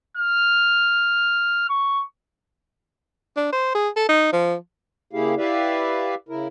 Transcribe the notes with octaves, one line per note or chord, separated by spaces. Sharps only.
F6
C#6
D4
C5
G#4
A4
D#4
F3
C#3 A#3 E4 G4 G#4 F5
E4 G4 B4 D5 E5 F5
C#3 E4 A#4